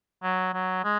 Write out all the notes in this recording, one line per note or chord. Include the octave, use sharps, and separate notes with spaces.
F#3
F#3
G#3